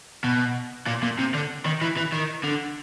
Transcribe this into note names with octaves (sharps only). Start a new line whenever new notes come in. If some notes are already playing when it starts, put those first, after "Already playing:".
B2
A#2
A#2
C3
D3
D#3
E3
E3
D#3
D3